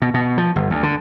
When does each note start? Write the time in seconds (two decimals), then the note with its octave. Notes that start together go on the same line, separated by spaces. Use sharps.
0.02 B2
0.14 B2
0.38 F3
0.56 G1
0.70 D2
0.83 D3